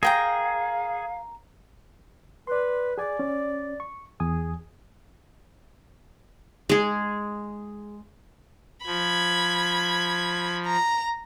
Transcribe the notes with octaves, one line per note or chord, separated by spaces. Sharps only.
G#4 A#4 F5 G5 A#5
B4 D5 C6
G#4 D5 G#5
C#4
C#6
E2 G#4 G#5 D#6
G#3 G#4
F3 B5 G#6
A#5